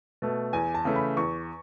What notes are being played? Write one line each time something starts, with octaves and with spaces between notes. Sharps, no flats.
B2 A3
E2 G#5
A5
C#3 E3 A3
B5
E2 C#6